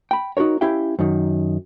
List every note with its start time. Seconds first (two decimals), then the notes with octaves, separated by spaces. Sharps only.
0.11 G5 B5
0.37 D#4 F#4 G4 A#4 C#5
0.61 C#4 E4 G4 E5 F5 G5
0.99 F#2 D#3